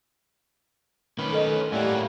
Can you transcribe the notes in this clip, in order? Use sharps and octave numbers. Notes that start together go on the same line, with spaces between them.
D#3 C#4 B4
A4 D#5
A2 G3 A#3 C#4 E5 F#5